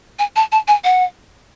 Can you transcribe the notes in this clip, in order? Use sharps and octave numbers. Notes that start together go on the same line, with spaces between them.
G#5
A5
A5
G#5
F#5